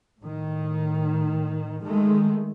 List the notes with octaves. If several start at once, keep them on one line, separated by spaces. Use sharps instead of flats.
A2 D#3
D#3 G#3 A3